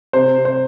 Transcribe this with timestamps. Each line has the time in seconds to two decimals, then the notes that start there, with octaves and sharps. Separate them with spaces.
0.13 C3 C5
0.38 C3
0.45 C5